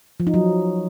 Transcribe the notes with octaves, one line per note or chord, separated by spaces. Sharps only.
F3
D#4
F#3